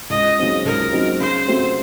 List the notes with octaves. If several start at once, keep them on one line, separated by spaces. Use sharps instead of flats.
C#2 D#5
C#3 F#3 C4 D#4
C#2 A#4
C#3 F#3 C4 D#4
C#3 C5
A3 C4 F#4